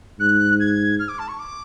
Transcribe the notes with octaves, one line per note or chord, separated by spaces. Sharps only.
G#2 F#6
G#6
F6
D6
A5
C#6
D6